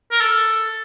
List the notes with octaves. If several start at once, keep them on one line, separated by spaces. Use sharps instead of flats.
A#4
A4